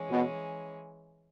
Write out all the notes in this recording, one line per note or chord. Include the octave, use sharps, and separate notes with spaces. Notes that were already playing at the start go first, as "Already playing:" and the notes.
Already playing: E3 G#3 C#4
B2